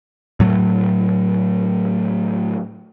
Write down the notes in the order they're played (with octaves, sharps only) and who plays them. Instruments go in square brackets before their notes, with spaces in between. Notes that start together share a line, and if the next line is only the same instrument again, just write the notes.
[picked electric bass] A2 F#3 A3